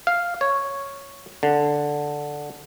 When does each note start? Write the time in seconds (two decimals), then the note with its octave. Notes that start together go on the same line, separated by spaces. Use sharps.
0.07 F5
0.41 C#5
1.43 D3